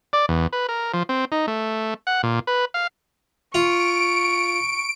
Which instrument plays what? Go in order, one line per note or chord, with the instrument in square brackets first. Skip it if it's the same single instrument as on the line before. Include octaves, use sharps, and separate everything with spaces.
[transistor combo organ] D5
E2
B4
A#4
F3
C4
D#4
A3
F#5
A#2
B4
F5
[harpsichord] F4 [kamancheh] C#6 [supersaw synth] D7